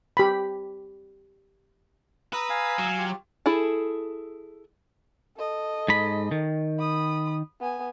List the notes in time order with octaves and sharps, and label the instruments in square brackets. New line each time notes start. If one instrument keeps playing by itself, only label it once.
[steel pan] G4 B5
[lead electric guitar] B4 [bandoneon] A#5 D#6 E6
[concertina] F5 G#5
[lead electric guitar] F#3
[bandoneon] F4 G4
[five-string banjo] E4 G#4 A4
[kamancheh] A4 D#5
[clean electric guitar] G#2 B5
D#3
[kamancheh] B5 D#6
B3 G#5